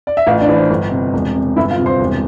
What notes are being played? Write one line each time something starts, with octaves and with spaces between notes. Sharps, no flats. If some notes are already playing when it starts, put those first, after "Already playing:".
D5
E5
A1 F4 F5
D4 D5
E3
C5
G1
C3
E1
C3
G1 E4 E5
F4 F5
C3
C5 C6
E1